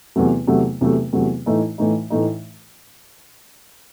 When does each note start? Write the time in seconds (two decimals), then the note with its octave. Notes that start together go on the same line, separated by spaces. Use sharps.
0.16 E2 C3 F#3 A3
0.47 E2 C3 F#3 A3
0.81 E2 C3 F#3 A3
1.13 E2 C3 F#3 A3
1.46 A2 E3 A3 D#4
1.78 A2 E3 A3 D#4
2.10 A2 E3 A3 D#4